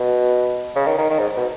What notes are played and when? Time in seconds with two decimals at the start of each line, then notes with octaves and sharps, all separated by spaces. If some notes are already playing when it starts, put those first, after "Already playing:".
Already playing: B2
0.76 C#3
0.87 D#3
0.98 D#3
1.10 D#3
1.19 G#2
1.36 B2